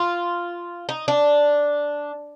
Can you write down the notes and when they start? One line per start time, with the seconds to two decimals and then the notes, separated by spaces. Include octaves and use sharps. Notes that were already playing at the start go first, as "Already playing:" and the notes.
Already playing: F4
0.89 D#4
1.08 D4